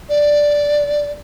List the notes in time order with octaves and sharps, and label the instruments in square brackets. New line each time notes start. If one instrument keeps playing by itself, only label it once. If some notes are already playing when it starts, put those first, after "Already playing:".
[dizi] D5